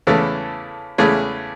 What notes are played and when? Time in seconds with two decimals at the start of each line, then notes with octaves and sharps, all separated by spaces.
0.07 E2 C#3 E3 A3 A4
0.98 E2 C#3 E3 A3 G#4